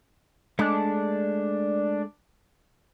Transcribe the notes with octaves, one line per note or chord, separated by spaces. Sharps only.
G#3 A3 D4